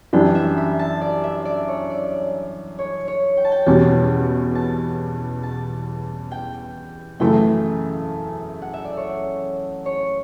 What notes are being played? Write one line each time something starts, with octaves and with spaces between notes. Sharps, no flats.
F#2 E3 G3 D4 G5
E5
B5
A5
D5
E5
D5
C#5
D5
C#5
C#5
G5
A5
G5
E2 B2 G3 C#4 A5
A5
A5
G5
F#2 C#3 E3 A3 G5
F#5
E5
D5
C#5
C#5